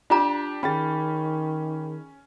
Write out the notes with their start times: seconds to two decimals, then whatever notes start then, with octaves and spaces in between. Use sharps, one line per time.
0.10 D4 F4 G4 A#5
0.63 D#3 C#4 G#4 G5 B5 A6